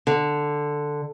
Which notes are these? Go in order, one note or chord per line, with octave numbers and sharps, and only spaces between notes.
D3